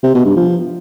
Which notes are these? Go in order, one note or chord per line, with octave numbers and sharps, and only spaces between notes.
C3
B2
G2
F3